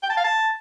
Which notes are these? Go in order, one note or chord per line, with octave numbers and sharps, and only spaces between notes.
G5
A5
F5
A5